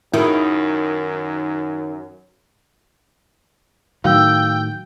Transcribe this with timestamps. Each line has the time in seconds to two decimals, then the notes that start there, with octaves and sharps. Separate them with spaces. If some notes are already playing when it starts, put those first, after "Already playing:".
0.14 F#2 D#3 E4 F#4 G#4
4.04 A2 D#3 F#3 F5 G5 E6